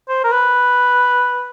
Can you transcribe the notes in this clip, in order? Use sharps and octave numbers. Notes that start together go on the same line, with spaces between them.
C5
A#4
B4